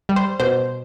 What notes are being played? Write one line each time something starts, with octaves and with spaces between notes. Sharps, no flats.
G3
C5
B2 C5